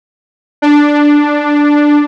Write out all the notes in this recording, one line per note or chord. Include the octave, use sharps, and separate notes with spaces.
D4